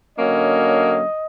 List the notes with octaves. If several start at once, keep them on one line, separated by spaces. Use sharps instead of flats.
D3 F#3 A#3 C#4 D#5